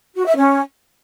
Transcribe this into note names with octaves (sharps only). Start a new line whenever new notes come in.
F#4
E5
C#4